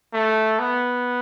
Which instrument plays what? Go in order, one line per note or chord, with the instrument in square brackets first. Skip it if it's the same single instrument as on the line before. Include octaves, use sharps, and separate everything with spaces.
[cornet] A3
B3